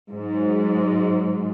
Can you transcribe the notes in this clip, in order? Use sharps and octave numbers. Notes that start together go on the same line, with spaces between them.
G#2 F#3